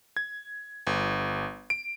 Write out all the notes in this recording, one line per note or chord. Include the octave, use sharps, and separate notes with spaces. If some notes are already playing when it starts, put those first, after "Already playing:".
G#6
G1
D7